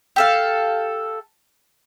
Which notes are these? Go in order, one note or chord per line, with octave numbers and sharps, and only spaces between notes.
G4 A4 F5